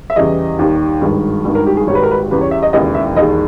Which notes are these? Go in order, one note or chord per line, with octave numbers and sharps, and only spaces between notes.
E5
E2 C#3 E3 G3 D#5
D#2 D#3 G3
G#1 G2 D#3 G#3
G#1 G2 D#3
A#4
G4
G#4
G#1 G#2 D#3 G3 C#5
B4
A#4
B4
E2 C#3 G3 B4
C#5
E5
D#5
E1 D#2 C#3 E3 D#5
E5
E1 D#2 D#3 G#3 D#5